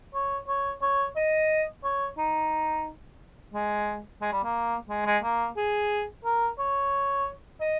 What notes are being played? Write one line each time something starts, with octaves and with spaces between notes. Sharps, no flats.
C#5
C#5
C#5
D#5
C#5
D#4
G#3
G#3
G3
A#3
G#3
G#3
A#3
G#4
A#4
C#5
D#5